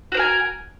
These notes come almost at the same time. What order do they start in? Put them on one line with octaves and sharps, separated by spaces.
F#4 C5 A#4 G#5